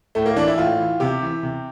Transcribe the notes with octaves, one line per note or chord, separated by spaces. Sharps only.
A2 A3
A#3
E3 D4
E4
A2 F4
E3
C3 G4
E3
C3